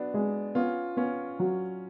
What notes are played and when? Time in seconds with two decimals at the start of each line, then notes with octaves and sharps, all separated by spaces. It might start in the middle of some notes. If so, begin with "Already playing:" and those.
Already playing: F#3 B3 D4
0.14 G#3
0.55 B3 C#4 F4
0.97 B3 C#4 F4
1.39 F#3